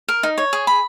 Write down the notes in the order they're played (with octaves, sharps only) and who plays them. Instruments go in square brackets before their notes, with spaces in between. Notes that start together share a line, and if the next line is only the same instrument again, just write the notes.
[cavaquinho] A#4
D#4
C#5
G#4
B5